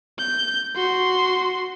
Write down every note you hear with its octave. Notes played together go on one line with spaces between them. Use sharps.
G6
F#4 C6